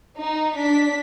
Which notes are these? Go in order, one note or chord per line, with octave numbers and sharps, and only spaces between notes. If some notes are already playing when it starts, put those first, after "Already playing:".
D#4
D4 B6